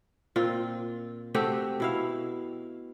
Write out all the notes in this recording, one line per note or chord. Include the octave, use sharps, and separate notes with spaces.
A#2 C4 F4
A3 C4 F#4 G4
B2 E4 F5